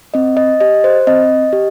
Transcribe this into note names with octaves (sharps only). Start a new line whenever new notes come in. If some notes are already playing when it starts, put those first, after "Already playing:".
C4 D#5
D#5
G4 D#5
C5
C4 D#5
G4